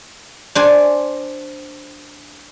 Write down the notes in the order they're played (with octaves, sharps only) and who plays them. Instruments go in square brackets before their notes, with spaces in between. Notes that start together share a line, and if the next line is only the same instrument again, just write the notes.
[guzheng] D4 C5 G#5